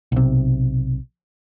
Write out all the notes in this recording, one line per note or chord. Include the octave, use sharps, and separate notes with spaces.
B1 C3